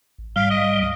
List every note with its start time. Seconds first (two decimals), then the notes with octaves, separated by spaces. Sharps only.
0.18 A1
0.36 G#2 G3 F5
0.50 D#5
0.80 C#2 D#5